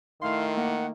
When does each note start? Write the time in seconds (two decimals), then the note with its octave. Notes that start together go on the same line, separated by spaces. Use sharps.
0.22 D#3 A3 E4 F5 C6
0.57 A#3 F#5